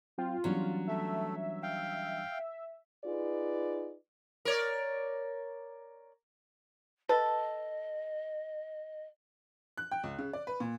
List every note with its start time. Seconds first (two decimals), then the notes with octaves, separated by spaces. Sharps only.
0.18 F#3 C4 F4 G5
0.44 E3 F#3 G3 B3 C#4 D4
0.88 A3 E5
1.63 F5 G5
3.05 D#4 F4 G#4 B4 D5
4.45 A#4 C#5 D5
7.09 A4 B4 D#5
9.77 F#6
9.91 G5
10.03 C#2
10.19 C#3
10.33 D5
10.47 B4
10.60 A#2